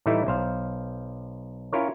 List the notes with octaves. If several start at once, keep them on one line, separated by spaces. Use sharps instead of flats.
A2 E3 G3 A3 D#4 E4
B1 C5 F5
C#4 E4 F4 A#4 C#5